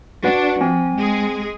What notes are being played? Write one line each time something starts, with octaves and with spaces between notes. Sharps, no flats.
D4 F#4 B4 F#5
F3 C4 G#5
G#3 G#4